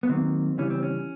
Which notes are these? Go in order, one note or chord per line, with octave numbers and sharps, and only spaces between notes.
B3
D#3 F#3 A#3 C4
C#3 E3 G3 C#4
C4
C#4